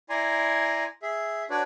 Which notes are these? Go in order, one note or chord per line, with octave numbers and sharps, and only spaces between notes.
E4 D5 G#5 A#5 C6
G#4 E5
D4 F#4 B4 C#5 D5